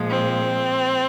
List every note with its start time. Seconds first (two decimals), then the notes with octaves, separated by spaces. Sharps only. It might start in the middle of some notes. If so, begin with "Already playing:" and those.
Already playing: A#2 F3 G#3
0.10 C4